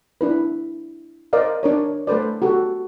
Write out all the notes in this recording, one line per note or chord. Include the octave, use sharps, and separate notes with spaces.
D4 E4 B4
A#4 C5 D5 D#5 F5
D4 A#4 C#5
A3 A4 B4 C5 D5
F#4 G4 A4